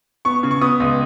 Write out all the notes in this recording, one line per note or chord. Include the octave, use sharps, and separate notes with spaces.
B3 C#6
C#3
C#6
B3 D#6
C#2